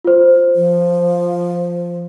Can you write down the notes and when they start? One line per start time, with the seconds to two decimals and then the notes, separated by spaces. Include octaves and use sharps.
0.04 F4 C5
0.56 F3